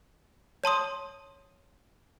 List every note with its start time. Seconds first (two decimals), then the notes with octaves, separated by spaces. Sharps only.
0.64 C#5 A5 C6 D#6